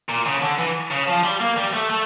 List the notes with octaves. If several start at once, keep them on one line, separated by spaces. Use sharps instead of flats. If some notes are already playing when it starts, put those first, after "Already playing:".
A#2
C#3
D3
E3
C#3
F3
G3
A#3
G3
A3
A3